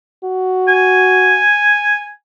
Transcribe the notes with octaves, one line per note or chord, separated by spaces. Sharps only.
F#4
G#5